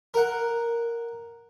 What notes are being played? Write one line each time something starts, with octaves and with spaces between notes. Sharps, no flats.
A#4 F#5